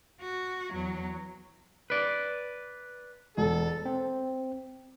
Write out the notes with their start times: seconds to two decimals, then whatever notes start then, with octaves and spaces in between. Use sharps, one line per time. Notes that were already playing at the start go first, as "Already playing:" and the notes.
0.21 F#4
0.72 E2 F#3
1.90 B4 D5
3.37 E1 A4
3.86 C4